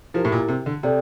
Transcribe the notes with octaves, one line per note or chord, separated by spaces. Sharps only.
F3 E4 G4 A#4
A2
A#2
C3
D3
C3 A4 D5 G5